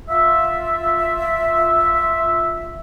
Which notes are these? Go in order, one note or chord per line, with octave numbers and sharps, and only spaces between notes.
F4 E5